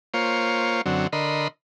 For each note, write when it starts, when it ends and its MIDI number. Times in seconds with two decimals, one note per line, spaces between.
0.14 0.81 58
0.14 0.81 65
0.14 0.81 72
0.14 0.81 73
0.86 1.07 42
0.86 1.07 50
0.86 1.07 54
0.86 1.07 60
1.13 1.48 50
1.13 1.48 70
1.13 1.48 75
1.13 1.48 83
1.13 1.48 84